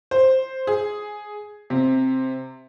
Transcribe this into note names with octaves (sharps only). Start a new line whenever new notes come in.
C5
G#4
C3